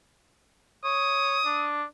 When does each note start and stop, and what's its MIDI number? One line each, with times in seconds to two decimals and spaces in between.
0.84 1.40 73
0.84 1.71 87
1.45 1.84 62